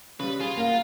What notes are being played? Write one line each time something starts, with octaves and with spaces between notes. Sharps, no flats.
C#3 G3 B4
F4 G#4
A#3 F#4 A#4 F5